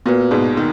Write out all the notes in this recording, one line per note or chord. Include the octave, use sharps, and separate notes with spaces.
A#2 B3 F#4 B4
G#2 B2
D#3